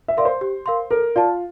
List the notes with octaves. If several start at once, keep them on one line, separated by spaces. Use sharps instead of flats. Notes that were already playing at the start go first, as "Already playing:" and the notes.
E5
A#4 D5 F5 C6
C5
G4
A#4 F5 C6
A4 A#4
F4 D5 A5